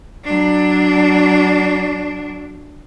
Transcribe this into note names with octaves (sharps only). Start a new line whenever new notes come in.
F#3 D4